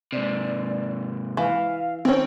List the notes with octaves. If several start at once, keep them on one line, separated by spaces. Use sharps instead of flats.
G#2 C3 D5
E3 F5
D#3 C4 C#4 C5